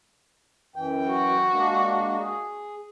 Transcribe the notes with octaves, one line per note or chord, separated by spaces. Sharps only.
F#2 E3 G5
F#4
G#3 A#3 D4
G#4